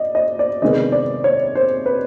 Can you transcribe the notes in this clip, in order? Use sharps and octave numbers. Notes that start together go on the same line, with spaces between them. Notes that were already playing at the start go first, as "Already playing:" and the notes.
Already playing: D5 D#5
D#5
D5
C3 D#3 G#3 B3 D#5
D5
C#5
C5
B4